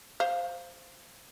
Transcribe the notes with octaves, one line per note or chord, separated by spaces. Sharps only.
C5 F5